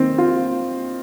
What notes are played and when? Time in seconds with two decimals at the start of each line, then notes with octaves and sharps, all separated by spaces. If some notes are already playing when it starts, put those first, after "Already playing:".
Already playing: D#3 C4
0.18 F4